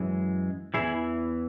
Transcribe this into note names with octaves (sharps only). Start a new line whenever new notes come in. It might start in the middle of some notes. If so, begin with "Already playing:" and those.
Already playing: F#2 E3 G#3
E2 C#3 E3 E4 G#4